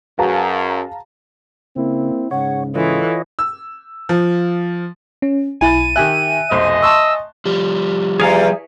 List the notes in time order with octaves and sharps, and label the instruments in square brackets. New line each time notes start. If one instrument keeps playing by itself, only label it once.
[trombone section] F#2 [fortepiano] F#4 G#4 B4 [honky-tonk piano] F5 A5 A#5
[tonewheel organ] C#3 [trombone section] A#3 C4 E4
[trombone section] G#2 C#3 [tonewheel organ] C#5 [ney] F#5
[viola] E3 [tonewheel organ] F4 C#5 D#5 [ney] A4
[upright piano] E6
F3
[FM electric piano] C#4
[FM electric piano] B1 E4 [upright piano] G#5 B5 A6 [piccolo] D#7
[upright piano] D#3 G4 F#6 [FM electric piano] E5 G#5
[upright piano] F1 B1 C5 [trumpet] D#5
[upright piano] A5 C6 C#6 [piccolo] E6
[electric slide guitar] F3 G3 [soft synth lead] G4
[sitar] E2 [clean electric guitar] G#4 F5